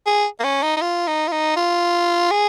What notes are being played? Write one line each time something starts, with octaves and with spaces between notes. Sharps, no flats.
G#4
A#3
C#4
D#4
D#4
F4
D#4
F4
D#4
F4
G#4